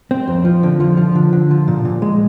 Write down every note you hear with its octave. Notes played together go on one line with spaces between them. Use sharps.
C4
F2
F3
D3
F3
F3
D3
D3
F3
A#2
A#2
G#3